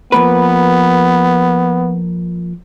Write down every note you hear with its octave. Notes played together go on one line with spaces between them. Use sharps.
F3 A#3 B3 B4